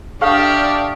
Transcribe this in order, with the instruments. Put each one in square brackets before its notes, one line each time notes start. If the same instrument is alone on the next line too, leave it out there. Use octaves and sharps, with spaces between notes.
[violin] D4 [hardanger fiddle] G4 E5 [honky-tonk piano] A4 F5 F6 [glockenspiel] C#6 D#6